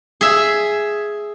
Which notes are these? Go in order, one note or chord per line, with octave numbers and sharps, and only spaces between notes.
G#4 E5